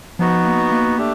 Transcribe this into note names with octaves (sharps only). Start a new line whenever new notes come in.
F3 B3 D#4 F#4
A#3
A#3
A3 D4 G4